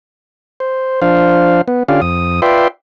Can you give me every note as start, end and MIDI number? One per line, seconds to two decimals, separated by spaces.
0.60 1.01 72
1.01 1.61 53
1.01 1.61 62
1.01 1.61 72
1.01 1.61 77
1.68 1.83 59
1.88 2.01 50
1.88 2.01 61
1.88 2.01 65
1.88 2.01 67
1.88 2.01 74
1.88 2.01 77
2.02 2.40 41
2.02 2.40 87
2.42 2.68 65
2.42 2.68 71
2.42 2.68 74
2.42 2.68 76
2.42 2.68 79
2.42 2.68 84